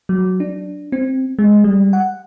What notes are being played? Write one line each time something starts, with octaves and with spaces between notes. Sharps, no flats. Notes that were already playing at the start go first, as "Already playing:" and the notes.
F#3
D4
C4
G#3
G3
F#5